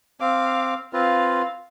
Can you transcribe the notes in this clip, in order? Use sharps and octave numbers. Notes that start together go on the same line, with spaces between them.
C4 F5 D6
C4 F4 B4 F5